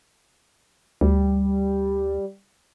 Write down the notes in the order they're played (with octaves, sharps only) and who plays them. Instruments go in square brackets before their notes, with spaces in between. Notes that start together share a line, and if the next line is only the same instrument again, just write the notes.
[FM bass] D2 [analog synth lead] G3